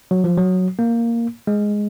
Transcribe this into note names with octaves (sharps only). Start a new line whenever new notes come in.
F#3
F3
F#3
A#3
G#3